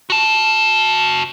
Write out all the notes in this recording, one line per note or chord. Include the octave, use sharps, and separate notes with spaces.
F#4 A5